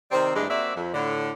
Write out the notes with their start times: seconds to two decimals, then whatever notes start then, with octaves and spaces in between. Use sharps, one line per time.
0.11 C3 D#3 G3 C4
0.35 E2 G2 D3 G#3 A3 D4
0.49 A#3 C4 F#4 D5 E5
0.76 F2
0.94 A2 D3